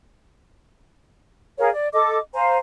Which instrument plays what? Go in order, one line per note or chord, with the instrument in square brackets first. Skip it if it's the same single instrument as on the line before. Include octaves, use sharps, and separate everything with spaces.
[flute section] G#4 A#4 C#5 F5
D5
A4 D#5 D6
C5 F5 G#5 A#5